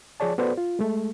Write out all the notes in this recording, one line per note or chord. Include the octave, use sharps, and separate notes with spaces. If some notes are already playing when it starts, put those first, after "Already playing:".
F3 G#4 C#5 D5 A5
B3 F#4 A4 B4 C5 D5
F4
G#3 A3